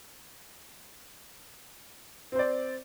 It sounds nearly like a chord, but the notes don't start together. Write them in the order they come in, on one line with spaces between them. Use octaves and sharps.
C4 C5 D5